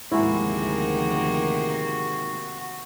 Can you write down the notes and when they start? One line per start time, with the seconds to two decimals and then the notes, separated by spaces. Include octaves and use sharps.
0.12 D2 G#2 C3 D#3 F3 A#3 E4 F#4